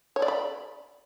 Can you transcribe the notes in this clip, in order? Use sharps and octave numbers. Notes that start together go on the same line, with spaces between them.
C#5
D5
B5